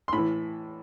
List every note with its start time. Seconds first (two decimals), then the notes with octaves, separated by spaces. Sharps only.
0.08 C6
0.13 A2 E3 B5